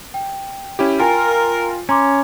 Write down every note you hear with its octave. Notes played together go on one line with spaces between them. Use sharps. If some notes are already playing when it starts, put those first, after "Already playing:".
G5
C#4 E4 G4
F4 A#4 G5 G#5
C#4 A#5 C6 D6